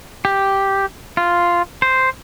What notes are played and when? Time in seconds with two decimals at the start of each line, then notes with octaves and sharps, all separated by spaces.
0.25 G4
1.17 F4
1.82 C5